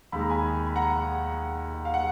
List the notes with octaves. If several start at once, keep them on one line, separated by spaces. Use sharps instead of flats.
D#2 D#3 G#3 B5
A#5
G#5 B5
B5
F#5 A#5
F5
F#5